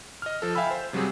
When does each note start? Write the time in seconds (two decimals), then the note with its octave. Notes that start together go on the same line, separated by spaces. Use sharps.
0.22 D#5 F6
0.42 F3 A4
0.55 E5 F5 G5 G#5 B5 E6
0.71 C5
0.93 C3 F#3 G3 C4 G#4